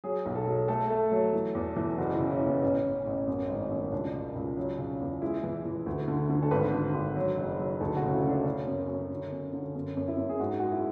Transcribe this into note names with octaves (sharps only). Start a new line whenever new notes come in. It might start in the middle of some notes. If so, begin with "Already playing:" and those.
F#3 G#4
B1
A4
F#3
A3 A4
A3
F#3
E3
E2
E3
F#1 F#4
C#3 E4
C#4
E3
B3
A1 C#4
A1
A1
F#2
G#1
F#2
C#2 D4
C#3
C#2
F#3
C#3
E2
G#3 E4
E3
E3
D2
D3
D3
A4
G#1 B4
D3
G#1
F#3
F#1
F#3
D2 A4
F#4
C#3
E4
C#3 D4
C#3 C#4
F#2
F#2
D3
F#2
D3
F#2 C#4
F#2
E4
F#2
G#4
G#2 F#4
G#3 F#4
E4